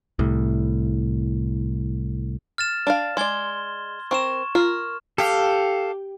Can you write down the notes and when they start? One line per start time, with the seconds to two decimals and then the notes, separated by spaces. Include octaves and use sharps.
0.19 C2 A2
2.58 F6 A6 E7
2.87 D4 D5 F5
3.17 G#3 D5 C6 G#6 G7
4.11 C4 A#4 C#6 E7
4.55 F4 A#4 F6
5.18 G4 A4 F5